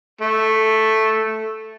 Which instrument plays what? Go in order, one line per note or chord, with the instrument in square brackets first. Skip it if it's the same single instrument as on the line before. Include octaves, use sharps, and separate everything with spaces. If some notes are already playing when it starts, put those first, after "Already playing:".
[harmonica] A3